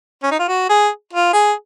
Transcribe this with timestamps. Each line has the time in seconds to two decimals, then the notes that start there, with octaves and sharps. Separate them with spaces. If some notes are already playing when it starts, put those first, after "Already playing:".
0.23 C#4
0.32 D#4
0.39 F4
0.48 F#4
0.69 G#4
1.13 F4
1.33 G#4